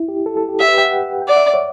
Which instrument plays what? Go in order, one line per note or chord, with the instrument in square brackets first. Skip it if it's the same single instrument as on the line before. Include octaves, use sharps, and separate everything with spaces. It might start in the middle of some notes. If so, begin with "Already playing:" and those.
Already playing: [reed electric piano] E4
G4
A4
A4
G4
[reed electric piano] G4 [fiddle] E5
[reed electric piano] B4
G5
F#5
G5
[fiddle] D5 [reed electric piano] F#5
[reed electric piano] E5
C#5